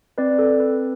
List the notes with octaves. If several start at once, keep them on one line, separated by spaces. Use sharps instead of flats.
C4 B4 D5
A4
C4
B4